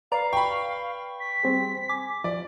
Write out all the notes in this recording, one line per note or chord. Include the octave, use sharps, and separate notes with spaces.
B4 D5 F5 A#5
G5 B5 C#6
B6
G3 C4 G#4
G#5 D6
F3 D5